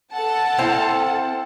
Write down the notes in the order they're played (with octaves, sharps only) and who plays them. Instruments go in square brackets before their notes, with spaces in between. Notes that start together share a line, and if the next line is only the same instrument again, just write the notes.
[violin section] A4 F#5 A5
[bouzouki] C4 E4 F5